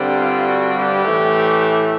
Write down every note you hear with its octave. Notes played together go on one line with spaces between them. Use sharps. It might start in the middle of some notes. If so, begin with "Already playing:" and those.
Already playing: G2 D3 G3 C4
F4
F#4
G4
A2 E3 A3